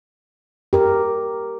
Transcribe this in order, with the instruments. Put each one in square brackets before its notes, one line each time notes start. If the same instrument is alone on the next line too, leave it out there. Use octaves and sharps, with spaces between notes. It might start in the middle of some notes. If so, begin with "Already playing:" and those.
[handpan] G4 A#4